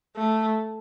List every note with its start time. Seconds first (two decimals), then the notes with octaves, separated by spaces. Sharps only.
0.17 A3